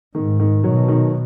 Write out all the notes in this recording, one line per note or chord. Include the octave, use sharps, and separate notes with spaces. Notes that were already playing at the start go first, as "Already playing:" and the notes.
G#2 D#3
D#3
B2 F#3
D#3